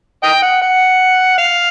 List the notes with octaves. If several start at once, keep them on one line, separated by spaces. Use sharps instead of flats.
D#5 G5
F#5
F#5
F5